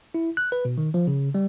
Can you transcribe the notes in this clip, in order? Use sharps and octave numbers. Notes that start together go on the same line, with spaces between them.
E4
F#6
B4
B2
D#3
F3
C#3
G3